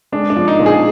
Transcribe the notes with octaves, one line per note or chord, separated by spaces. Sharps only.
G#3 D4
D4
F3
D#4
A#2
G#4